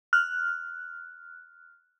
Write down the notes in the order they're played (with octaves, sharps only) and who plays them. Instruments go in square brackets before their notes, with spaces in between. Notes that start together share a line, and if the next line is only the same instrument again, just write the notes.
[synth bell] F6 F#6